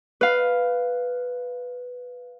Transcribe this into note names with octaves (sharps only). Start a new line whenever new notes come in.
B4 F5